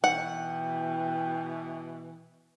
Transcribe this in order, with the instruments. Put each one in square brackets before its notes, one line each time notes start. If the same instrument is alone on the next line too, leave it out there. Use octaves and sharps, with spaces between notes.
[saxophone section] B2 E3 [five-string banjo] F#5 [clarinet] G5